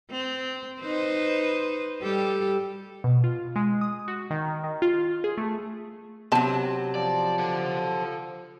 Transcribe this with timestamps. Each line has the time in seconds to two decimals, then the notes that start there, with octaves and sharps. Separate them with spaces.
0.11 C4
0.81 D#4 B4 C5
2.02 G3 G4 A4
3.04 B2
3.24 F4
3.56 G#3
3.81 D#6
4.08 F#4
4.30 D#3
4.64 D#3
4.82 F4
5.24 G#4
5.37 A3
6.32 C3 F#3 B3 A5
6.95 F3 D5
7.39 A4 F#5